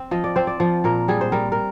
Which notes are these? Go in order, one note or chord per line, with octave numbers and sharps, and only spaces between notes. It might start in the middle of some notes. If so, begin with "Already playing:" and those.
Already playing: C4
F3 D#5
D5
C4 C5
D5
F3
A#2 A#4
G3 G#4
C5
G3 A#4
A#4